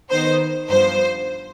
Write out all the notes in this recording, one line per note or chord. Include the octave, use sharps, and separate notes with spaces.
D#3 B3 D#4 C5
G2 F3 B3 C5